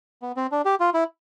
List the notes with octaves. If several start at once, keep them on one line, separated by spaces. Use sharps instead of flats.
B3
C4
D4
G4
F4
E4